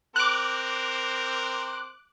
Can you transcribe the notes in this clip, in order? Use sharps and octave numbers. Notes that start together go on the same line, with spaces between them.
C4 A#4 C5 D6 F#6